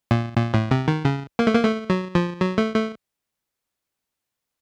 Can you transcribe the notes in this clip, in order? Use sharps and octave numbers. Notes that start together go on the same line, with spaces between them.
A#2
A#2
A2
C3
D#3
C#3
A#3
A3
A#3
A3
F#3
F3
F#3
A3
A3